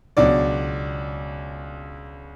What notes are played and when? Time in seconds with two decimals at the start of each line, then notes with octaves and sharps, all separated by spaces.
0.17 C#2 B2 F#3 D4 D5